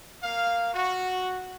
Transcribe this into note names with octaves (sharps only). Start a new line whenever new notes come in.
A#3 F5
F#4